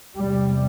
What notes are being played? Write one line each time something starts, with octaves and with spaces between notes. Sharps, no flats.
E2 C3 G3